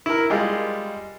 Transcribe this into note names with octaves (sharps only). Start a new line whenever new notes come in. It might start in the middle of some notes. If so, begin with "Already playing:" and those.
E4 A#4
G3 G#3 F4